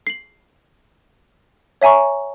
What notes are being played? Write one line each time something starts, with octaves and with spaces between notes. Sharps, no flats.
C7 F#7
C#5 E5 G#5 A#5 C#6